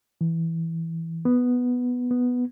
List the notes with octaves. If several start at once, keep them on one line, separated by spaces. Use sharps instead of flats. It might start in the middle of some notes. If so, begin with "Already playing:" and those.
E3
B3
B3